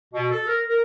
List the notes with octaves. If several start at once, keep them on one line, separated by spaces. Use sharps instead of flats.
B2
A4
A#4
A#4